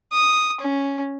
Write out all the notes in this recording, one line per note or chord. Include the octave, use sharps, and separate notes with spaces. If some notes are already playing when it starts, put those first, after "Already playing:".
D#6
C#4